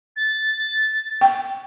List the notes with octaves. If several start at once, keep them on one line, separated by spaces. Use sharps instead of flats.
A6
G5